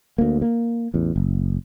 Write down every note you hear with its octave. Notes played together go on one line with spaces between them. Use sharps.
D2 A#3
A#3
A1 E2
F#1